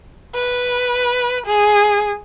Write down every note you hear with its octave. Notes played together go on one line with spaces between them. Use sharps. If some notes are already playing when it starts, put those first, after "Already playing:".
B4
G#4